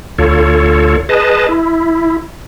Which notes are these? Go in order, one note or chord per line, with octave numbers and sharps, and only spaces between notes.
D2 F4 A4 C#5
G#4 B4 D#5 A5
E4